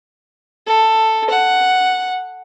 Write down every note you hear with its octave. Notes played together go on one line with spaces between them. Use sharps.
A4
F#5